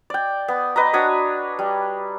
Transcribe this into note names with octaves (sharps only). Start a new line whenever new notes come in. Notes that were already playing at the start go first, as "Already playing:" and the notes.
D5 G5
B3
B4 D#5 A#5
D4 F#4 C#5 D#6
G3